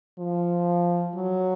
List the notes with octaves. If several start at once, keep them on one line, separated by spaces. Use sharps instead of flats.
F3
F#3